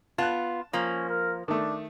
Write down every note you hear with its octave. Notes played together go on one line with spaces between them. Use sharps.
B3 F4 A5 F#6
F3 A#3 C#4
A#4
D#3 A3 D4